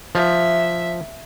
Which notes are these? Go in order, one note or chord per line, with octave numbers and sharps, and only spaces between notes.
F3 E5